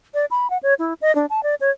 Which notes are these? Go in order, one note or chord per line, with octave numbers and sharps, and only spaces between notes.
D5
B5
F#5
C#5
E4
D#5
D4
A5
D5
C#5